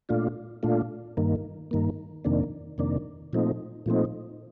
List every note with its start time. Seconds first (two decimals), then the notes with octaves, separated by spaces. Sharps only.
0.09 A#2 A3 D4 F4
0.63 A#2 A3 D4 F4
1.17 G2 D#3 A#3
1.71 G2 D#3 A#3
2.25 F2 C3 D#3 A#3 D4
2.78 F2 C3 D#3 A#3 D4
3.33 A#2 F3 A3 C4 D#4
3.86 A#2 F3 A3 C4 D#4